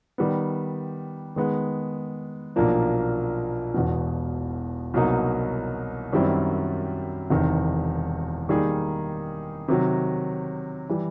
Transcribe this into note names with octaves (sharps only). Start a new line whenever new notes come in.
D#3 G3 B3
D#3 G#3 B3
B1 A#2 F3 A#3 D4
E1 E2 B2
C2 B2 F#3 A#3 D#4
F#2 D#3 G3 C4 E4
E1 E2 C3 D#3
D#3 G3 A#3 D#4 G#4
C3 D#3 F#3
E3 G3